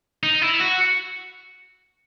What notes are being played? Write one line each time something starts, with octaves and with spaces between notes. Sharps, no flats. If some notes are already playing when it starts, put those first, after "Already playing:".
D#4
E4
F#4